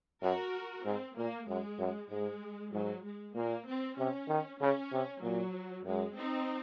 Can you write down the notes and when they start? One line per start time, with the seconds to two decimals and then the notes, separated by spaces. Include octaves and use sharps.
0.23 F#2 F#4 A#4
0.85 G#2 C4
1.17 A#2 A#3
1.48 F#2 G#3
1.79 F#2
2.10 G#2 G#3
2.73 G#2 F#3
3.04 G#3
3.35 A#2 A#3
3.67 C4
3.98 C3 C#4
4.29 D#3
4.61 C#3 C#4
4.92 C3
5.22 A#2 F#3
5.85 F#2 G#3
6.17 C4 D#4